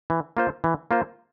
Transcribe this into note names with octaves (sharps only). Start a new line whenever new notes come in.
E3
A#3 F4 C5
E3
A#3 F4 C5